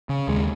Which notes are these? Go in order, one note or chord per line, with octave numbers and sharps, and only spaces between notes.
C#3
D#2 G#3